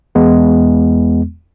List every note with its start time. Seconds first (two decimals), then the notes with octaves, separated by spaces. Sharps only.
0.15 E2 G#3 B3